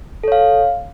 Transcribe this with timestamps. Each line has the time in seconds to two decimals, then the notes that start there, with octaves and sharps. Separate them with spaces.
0.24 A4
0.28 C#5
0.32 F5